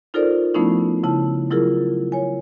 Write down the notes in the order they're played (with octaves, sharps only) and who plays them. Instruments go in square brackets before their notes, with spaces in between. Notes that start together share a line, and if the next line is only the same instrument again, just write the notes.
[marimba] D#4 F4 A4 A#4 C5 D5
F3 A3 B3 C#4 D#4 E4
C#3 E4 A5
F#3 E4 F4 G#4 A#4
C#5 G#5